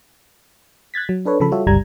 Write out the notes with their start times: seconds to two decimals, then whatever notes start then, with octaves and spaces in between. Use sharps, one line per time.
0.94 F#6 G#6 A6 B6
1.09 F#3
1.25 D4 A4 B4 C#5
1.40 C#3 F3 A4 B5
1.51 G3 F4 F#4 A4 C#5 E5
1.67 G1 C#2 G2 G3 A#5 G#6